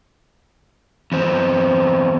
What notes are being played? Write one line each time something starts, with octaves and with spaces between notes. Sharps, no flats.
E2 C4